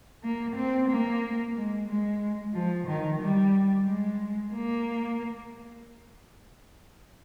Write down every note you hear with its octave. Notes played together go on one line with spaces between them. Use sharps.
A#3
C4
A#3
G#3
G#3
F3
D#3
G3
G#3
A#3